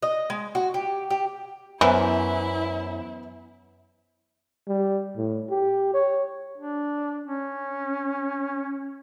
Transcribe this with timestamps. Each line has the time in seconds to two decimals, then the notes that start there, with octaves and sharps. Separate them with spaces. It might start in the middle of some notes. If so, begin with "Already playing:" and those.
0.02 D#5
0.30 G#3
0.55 F#4
0.74 G4
1.10 G4
1.81 F#2 E3 B3 E4 C5 E5
4.68 G3
5.17 A2
5.51 G4
5.94 C#5
6.58 D4
7.24 C#4